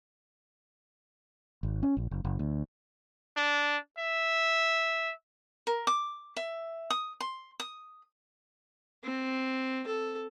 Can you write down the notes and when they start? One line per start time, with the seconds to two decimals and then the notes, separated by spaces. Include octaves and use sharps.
1.63 G#1
1.83 C#4
1.97 A#1
2.11 F#1
2.25 F#1
2.39 D2
3.37 D4
3.98 E5
5.67 A#4
5.87 D6
6.36 E5
6.90 D#6
7.20 C6
7.60 D#6
9.04 C4
9.87 A4